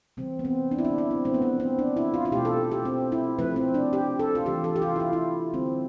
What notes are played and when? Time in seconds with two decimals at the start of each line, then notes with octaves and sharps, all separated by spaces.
0.17 C3 E3 G3 C4
0.39 B3
0.45 C4
0.71 D4
0.78 E4
0.85 D4
0.98 E4
1.11 C4
1.24 C3 F3 A3 C4
1.34 B3
1.42 C4
1.60 C4
1.79 D4
1.97 E4
2.14 F4
2.25 F4
2.31 B2 G4
2.35 A3
2.45 A4
2.72 G4
2.85 C4
3.12 E4
3.38 C3 F3 A3 B4
3.56 C4
3.74 D4
3.93 G4
4.19 A4
4.35 F4
4.46 C3 E3 A3 G4
4.64 A4
4.76 G4
4.82 F4
4.96 E4
5.00 F4
5.13 E4
5.53 D3 G3 C4